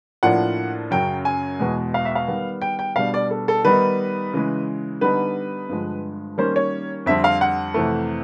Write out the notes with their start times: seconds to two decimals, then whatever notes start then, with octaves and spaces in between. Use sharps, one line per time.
0.23 A2 F3 A#3 D4 F4 F#5
0.91 F#2 C#3 F#3 G5
1.25 G#5
1.59 E2 B2 G#3
1.94 F5
2.05 E5
2.15 F5
2.28 D#3 G3 B3
2.62 G5
2.79 G5
2.96 B2 G3 B3 D4 F5
3.14 D5
3.31 A4
3.48 A4
3.64 D#3 G3 B3 D#4 B4
4.33 C#3 E3 G#3
5.01 D3 G3 B3 D#4 B4
5.69 G2 D3 F3 G#3
6.38 D#3 G3 A#3 C#4 C5
6.56 C#5
7.06 F2 D3 G3 C4 E5
7.24 F5
7.41 F#5
7.74 F2 C3 E3 A3